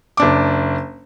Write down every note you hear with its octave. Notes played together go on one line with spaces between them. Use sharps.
F#1 D4 D6